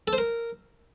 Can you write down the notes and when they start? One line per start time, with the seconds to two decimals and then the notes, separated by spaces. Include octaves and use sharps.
0.08 A4
0.13 C5
0.18 A#4